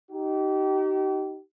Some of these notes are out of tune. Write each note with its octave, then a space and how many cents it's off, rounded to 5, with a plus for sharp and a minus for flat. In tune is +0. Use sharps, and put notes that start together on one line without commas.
D#4 +0 G4 -35